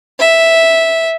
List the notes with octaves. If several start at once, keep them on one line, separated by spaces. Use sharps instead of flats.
E5